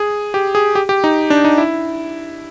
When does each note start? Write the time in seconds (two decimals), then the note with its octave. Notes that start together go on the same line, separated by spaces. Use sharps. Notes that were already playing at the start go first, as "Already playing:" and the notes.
Already playing: G#4
0.34 G4
0.55 G#4
0.75 G4
0.89 G4
1.04 D#4
1.30 D4
1.45 D#4
1.58 E4